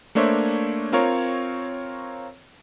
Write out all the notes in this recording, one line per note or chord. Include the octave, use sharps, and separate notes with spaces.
A3 A#3 D4 C5 C#5 E5
C4 F4 A#4 C#5